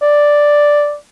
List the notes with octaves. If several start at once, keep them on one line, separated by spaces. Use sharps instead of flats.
D5